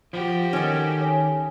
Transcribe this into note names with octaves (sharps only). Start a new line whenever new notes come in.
F3 F#4 G4
D#3 C#4 A4
C#5 G#5